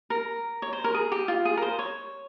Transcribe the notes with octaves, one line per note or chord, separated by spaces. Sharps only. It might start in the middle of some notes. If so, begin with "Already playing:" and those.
A#4
C#5
C5
A#4
G#4
G4
F4
G#4
A#4
C5
C#5